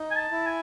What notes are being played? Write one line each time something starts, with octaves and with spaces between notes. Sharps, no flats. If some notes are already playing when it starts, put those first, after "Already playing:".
Already playing: D#4
G#5
A5
E4
G#5